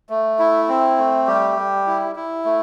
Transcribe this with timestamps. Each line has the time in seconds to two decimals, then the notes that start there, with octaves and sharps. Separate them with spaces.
0.10 A3
0.39 E4
0.68 C4
0.98 A3
1.27 G3 G4
1.56 G3
1.86 E4
2.15 E4
2.45 A3